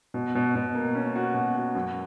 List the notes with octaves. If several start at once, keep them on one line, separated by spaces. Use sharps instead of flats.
B2
B2
B2
A#3
C#4
F#4
B2
F#4
F#2